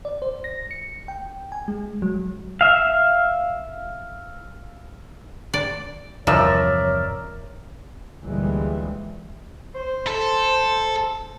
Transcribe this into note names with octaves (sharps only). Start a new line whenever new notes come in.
D5
C5
A#6
C#7
G5
G#5
G#3
F#3
E5 F5
D5
E2 G2 C3 F3 A#4 C#5 D5 E5
D2 A#2 E3 G3 G#3
C5
A4